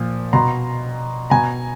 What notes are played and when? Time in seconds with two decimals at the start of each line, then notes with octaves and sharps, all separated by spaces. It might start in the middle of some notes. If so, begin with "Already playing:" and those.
Already playing: A#2 F3
0.33 B2 A#5 C6
1.30 B2 G#5 A#5